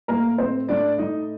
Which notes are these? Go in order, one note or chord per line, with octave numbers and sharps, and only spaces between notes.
A2 A#3 A#4
A2 C4 C5
A2 D4 D5
A2 D#4 D#5